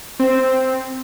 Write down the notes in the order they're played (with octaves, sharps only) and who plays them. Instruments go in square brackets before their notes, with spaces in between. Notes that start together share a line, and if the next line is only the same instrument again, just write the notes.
[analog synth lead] C4